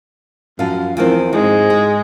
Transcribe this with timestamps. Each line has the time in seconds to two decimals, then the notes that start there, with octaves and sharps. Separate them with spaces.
0.59 F#2 F3 F5
0.97 E2 D#3 F3 C4
1.33 G#2 G#3 C4
1.70 G#4